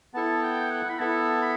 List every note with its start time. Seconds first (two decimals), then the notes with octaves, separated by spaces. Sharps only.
0.14 B3 E4 A4 A5
0.42 G5
0.60 G5
0.70 F#5
0.89 B5
0.99 B3 E4 A4 A5
1.42 B5